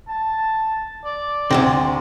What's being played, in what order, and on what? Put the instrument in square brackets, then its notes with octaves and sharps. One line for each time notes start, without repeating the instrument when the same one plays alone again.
[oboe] A5
D5
[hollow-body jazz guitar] D2 G#2 C3